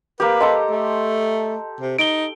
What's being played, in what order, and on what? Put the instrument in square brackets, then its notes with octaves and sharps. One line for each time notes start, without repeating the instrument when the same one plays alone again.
[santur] A#3 G4 [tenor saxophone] B4
[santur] A4 A#5 C6 [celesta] D#5
[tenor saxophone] A3
C3
[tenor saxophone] D#4 [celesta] D7 G7